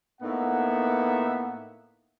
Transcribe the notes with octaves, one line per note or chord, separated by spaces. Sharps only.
A2 A#3 B3 D#4 E5 F#5